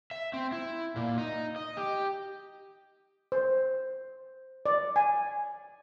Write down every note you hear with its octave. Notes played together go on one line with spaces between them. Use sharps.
E5
C4
E4
A#2
D#4
D#5
G4
C5
D5
G#5